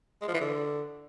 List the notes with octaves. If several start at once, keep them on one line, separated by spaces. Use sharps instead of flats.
G#3
F3
E3
D3